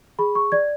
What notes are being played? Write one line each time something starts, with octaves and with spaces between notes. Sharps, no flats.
G#4 B5
C#6
D5 G#6